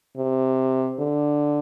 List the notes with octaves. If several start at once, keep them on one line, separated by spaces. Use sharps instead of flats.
C3
D3